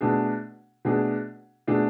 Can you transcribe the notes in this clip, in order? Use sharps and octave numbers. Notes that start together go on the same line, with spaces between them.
B2 A3 D4 G#4
B2 A3 D4 G#4
B2 A3 D4 G#4